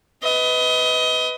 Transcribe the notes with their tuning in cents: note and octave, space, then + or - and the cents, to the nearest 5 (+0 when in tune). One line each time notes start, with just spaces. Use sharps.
B4 +15 D#5 +25